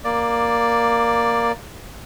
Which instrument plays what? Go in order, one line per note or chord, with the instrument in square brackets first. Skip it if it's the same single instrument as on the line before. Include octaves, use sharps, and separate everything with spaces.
[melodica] A#3 D5